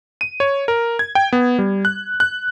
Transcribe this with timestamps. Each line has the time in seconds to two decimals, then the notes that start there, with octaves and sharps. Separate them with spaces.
0.21 D#7
0.40 C#5
0.68 A#4
0.99 G#6
1.15 G5
1.32 B3
1.59 G3
1.85 F#6
2.20 F#6